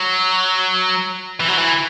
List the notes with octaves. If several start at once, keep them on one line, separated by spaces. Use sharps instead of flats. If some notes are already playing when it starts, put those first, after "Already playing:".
Already playing: F#3
E3
F#3
E3